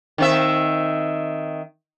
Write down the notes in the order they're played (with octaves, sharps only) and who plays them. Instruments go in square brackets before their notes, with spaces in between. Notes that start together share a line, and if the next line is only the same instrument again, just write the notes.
[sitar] D#3 C4 E5